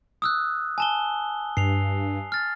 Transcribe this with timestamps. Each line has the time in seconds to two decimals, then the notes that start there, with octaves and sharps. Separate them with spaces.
0.22 D#6 E6 F#6
0.78 G#5 A5 G7
1.57 G2 C7 F7
2.32 F6 A6